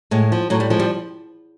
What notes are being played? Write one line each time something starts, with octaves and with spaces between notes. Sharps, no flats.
A2 G#3
F3
A2 F#3
G3
F3 G#3
G3